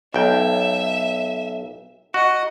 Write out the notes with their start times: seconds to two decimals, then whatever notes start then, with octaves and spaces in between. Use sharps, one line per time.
0.14 B1 E5 G5
2.14 F#4 D#5